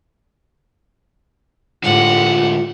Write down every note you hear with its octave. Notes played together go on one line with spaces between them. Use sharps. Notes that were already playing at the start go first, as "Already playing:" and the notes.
A2 D3 G#3 F4 G4 F#5